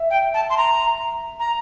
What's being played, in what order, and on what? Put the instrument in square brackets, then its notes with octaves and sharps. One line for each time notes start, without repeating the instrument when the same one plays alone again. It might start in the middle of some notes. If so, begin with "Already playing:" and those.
Already playing: [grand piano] E5
[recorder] G5
A5
C6
A#5
A#5